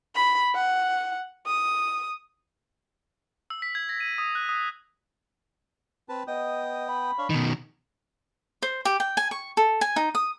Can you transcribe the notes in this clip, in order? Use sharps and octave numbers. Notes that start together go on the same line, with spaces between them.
B5
F#5
D#6
E6
B6
G#6
A#6
D#7
D#6
F#6
D#6
C4 B4 A5
B3 D#5 G5 D#6
B5
D4 C#5 F5
B2 D#3 D#5
C5
G4
G5
G#5
C#6
A4
G#5
D#4
D#6